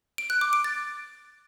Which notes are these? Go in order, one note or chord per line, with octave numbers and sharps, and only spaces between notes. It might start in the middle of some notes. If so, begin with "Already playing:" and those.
D7
F#6
D6
D7
A6